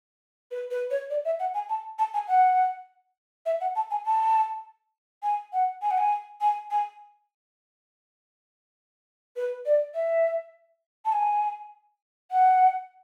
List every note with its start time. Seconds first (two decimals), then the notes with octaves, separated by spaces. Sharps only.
0.51 B4
0.71 B4
0.91 C#5
1.10 D5
1.25 E5
1.40 F#5
1.54 G#5
1.69 A5
1.99 A5
2.14 G#5
2.28 F#5
3.46 E5
3.61 F#5
3.76 A5
3.91 G#5
4.05 A5
5.23 G#5
5.53 F#5
5.82 G#5
5.91 F#5
5.98 G#5
6.41 G#5
6.71 G#5
9.36 B4
9.66 D5
9.95 E5
11.05 A5
11.13 G#5
12.31 F#5